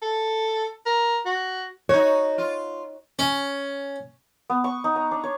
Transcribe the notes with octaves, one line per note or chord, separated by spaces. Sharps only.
A4
A#4
F#4
D#4 F#4 C#5
F4
C#4
B3
C#6
D#4
A#5
D4
C#5